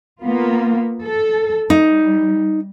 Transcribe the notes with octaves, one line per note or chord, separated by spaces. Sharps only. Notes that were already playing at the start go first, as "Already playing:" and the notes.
A#3 B3 F4
A4
G3 D#4